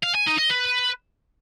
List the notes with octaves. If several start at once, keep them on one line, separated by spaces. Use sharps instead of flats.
F5
G#5
D#4
D#5
B4